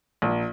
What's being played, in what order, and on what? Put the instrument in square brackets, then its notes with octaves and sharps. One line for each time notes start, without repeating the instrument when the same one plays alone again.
[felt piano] A#1